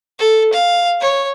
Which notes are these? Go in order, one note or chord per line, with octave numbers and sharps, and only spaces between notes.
A4
F5
C#5